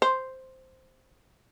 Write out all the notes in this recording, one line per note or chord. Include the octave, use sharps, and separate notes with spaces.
C5